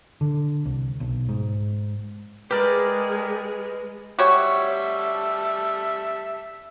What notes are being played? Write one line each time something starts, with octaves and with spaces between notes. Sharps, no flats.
D3
C2
B1
G#2
G#3 G4 G#4 A#4 B4 D5
G3 F#4 G4 C#5 E5 A5